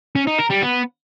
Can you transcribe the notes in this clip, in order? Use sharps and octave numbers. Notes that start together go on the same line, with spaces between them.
C#4
D#4
A#4
G3
B3